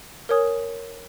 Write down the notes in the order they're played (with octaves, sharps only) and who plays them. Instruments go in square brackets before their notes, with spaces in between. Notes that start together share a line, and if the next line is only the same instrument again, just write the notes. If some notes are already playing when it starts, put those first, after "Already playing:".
[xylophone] A#4 C#5 G#5 D#6